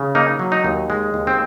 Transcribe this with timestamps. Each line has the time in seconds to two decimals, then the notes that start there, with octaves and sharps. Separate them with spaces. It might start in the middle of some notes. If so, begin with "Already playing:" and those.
Already playing: C#3
0.15 A#3 D#4
0.39 F#3
0.52 D#4
0.64 D#2
0.90 G#3
1.14 D#2
1.27 C4